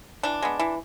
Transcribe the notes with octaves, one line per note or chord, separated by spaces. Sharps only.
E3 D4
G#3 B3
E3